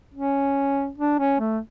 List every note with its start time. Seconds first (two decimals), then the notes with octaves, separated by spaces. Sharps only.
0.14 C#4
0.98 D4
1.20 C#4
1.40 A3